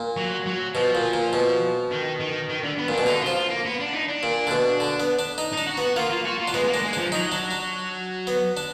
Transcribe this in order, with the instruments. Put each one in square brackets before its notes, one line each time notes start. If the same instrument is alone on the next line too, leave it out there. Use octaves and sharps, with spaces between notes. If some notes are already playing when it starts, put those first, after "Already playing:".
Already playing: [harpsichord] A#2
[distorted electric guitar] F#3
F#3
[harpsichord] B2 [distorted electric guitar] F3
[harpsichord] A#2
A#2
B2
[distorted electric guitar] D#3
D#3
D#3
D3
B3
[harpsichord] A#2 [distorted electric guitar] D4
[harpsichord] B2
[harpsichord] D3 [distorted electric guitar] D#4
[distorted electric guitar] F4
[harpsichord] F3
[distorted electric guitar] F4
A#3
B3
D4
D#4
D4
[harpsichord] A#2
D3
B2
D3
B3
D4
D#4
[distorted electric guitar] D#4
[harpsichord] D4
[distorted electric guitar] F#4
[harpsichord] B3 [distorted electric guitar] F#4
[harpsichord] A#3 [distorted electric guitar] F4
[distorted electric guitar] F4
F#4
F4
[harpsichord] D4
[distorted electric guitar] G#3 [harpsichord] B3
[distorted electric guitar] G#3
A#3
[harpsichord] D4
[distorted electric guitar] G#3
[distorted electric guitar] F3 [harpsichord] D4
[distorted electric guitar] F#3 [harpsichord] D#4
[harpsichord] D4
D4
B3
D4